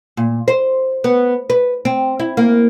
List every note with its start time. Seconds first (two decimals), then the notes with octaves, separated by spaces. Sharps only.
0.17 A#2
0.48 C5
1.04 B3
1.50 B4
1.85 C4
2.20 E4
2.37 A#3